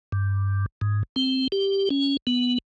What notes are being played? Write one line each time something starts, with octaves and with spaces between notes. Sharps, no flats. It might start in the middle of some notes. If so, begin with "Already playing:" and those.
G2
G#2
C4
G4
C#4
B3